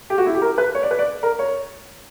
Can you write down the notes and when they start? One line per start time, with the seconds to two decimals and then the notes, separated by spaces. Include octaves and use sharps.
0.10 G4
0.18 F#4
0.26 E4
0.35 G4
0.42 A#4
0.58 B4
0.75 C#5
0.83 D5
0.91 B4
0.99 D5
1.23 A#4
1.39 C#5